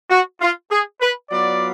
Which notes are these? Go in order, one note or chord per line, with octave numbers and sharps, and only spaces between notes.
F#4
F4
G#4
B4
F#3 B3 F4 D5